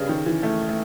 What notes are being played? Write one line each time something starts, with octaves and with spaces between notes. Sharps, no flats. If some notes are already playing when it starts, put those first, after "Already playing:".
Already playing: G2 C#3
D#3
E3
A3
A3